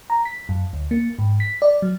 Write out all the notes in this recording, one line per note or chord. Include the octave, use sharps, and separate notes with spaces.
A#5
B6
F#2
D2
A#3
G#2
B6
D5
F#3